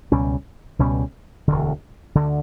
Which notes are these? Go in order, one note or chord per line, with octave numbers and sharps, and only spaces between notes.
C#2 B2 G3 C#4
C#2 B2 G3 C#4
E1 D2 D3
D2 D3